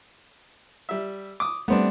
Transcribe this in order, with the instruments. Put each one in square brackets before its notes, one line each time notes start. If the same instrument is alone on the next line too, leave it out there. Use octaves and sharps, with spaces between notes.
[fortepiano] G3 E5
D6 D#6
[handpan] G3 A3 [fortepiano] B3 C4 D4